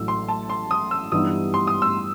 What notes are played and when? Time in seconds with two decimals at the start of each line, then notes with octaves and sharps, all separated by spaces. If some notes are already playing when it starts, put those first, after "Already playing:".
Already playing: A1 A2 F#3 A3 E6
0.08 C6
0.28 A5
0.50 C6
0.71 D#6
0.91 E6
1.12 G2 E3 G3 B3 D#4 D#6
1.54 C6
1.67 D#6
1.82 E6